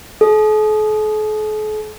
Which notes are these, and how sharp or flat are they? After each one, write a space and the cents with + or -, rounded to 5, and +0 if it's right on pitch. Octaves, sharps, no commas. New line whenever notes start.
A4 -45